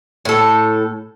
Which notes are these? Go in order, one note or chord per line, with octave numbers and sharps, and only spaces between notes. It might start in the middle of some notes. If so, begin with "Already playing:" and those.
A2 A4